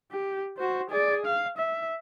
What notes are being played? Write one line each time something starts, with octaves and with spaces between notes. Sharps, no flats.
G4
F#4 C5
G#4 D5
F5
E5